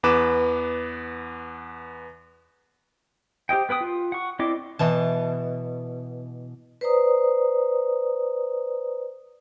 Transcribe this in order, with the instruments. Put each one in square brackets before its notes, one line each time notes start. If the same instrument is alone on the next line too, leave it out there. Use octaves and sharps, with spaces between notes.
[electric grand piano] E2 B3 B4 D6 E7
[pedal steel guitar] G4 C5 D#5 G5
B3 B4 G5 D#6
F4
F#5 C#6
C4 E4 D5 D#5 D6
[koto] B2 E3 A5
[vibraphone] B4 C5 D5 A#5 D#6